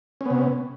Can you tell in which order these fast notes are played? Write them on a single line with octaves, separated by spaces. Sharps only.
C#4 B3 C3